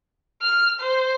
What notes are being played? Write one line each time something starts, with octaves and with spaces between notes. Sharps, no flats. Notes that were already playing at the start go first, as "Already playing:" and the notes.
F6
C5